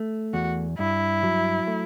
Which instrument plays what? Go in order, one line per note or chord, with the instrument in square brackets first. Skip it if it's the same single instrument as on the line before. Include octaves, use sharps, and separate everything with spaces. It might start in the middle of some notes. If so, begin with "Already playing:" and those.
Already playing: [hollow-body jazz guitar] A3
[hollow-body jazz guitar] E2 [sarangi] F#4
[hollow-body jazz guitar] G2 [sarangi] E4
[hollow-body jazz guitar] F#3
A3